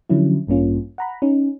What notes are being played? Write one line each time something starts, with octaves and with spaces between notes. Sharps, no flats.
D3 F3 F#3 C#4 E4
A1 G2 A#3 C#4 F4
F#5 A#5 B5
C#4 D#4